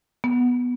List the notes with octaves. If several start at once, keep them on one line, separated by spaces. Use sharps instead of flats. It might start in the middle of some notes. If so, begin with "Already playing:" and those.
B3